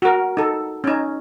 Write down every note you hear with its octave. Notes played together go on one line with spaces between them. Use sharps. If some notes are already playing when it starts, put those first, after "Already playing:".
F#4 A#4
D#4 A4
C#4 D#4